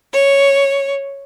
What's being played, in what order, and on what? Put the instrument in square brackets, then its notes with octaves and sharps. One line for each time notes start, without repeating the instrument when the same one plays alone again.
[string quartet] C#5